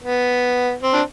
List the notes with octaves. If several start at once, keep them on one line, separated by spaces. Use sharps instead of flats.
B3
C4
D4